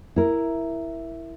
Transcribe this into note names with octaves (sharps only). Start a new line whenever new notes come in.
E4 A#4